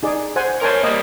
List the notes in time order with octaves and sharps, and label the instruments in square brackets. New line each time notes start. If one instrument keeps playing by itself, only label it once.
[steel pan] D#4 G#4 D5
C5 F#5 G#5
[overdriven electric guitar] A#4 C#5 [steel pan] C5 G#5 A5
[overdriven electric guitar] G3 A#3 [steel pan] D#5